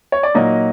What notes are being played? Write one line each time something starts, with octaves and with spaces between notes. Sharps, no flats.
C#5
D5
A#2 F#3 A#3 D#4 D#5